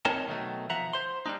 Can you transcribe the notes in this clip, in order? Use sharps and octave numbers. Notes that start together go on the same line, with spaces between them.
C4 D#4 A#4 C#5 D#5 A5
B2 D#3 F#3 A3
F3 E5 F#5 A#5
C5 C6
G3 D4 D#4